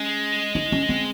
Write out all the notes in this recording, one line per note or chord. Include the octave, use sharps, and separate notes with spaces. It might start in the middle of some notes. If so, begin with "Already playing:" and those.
Already playing: G#3 C#4
D#4
C#4
C4